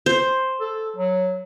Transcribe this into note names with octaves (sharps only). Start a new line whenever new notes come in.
C5
A4
F#3